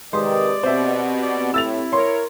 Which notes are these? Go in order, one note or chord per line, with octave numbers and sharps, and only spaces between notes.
C3 D#3 G#3 G4 B4 D5 C6 D#6
B2 C4 G4 C5 E5
D5
A2 E4 E6 A6 F7
A#4 C#5 C6